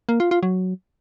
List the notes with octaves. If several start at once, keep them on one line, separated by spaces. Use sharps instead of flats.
A#3
F4
F4
F#3